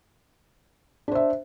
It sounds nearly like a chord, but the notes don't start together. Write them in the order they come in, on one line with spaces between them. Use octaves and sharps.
D4 C5 E5